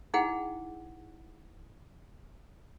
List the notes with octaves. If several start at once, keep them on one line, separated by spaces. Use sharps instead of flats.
D#4 E4 G#4 F#5 G5 B5